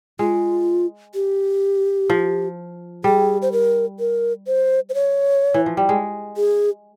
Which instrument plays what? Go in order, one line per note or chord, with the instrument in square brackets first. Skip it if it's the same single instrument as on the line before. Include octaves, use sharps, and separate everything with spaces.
[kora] G#3 [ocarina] F4
[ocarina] G4
[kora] F3
[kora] G3 [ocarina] G#4
[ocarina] C5
A#4
A#4
C5
C5
C#5
[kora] E3
F3
G3
G#3
[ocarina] G#4